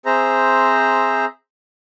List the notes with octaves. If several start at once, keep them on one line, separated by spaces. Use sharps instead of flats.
C4 G#4 C5 E5 A#5